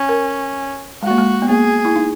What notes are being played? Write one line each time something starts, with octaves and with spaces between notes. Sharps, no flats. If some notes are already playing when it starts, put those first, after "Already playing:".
Already playing: C#4
A#4
G#3 F#4
A#3
G#3
B3
A#3 G#4
E4
D#4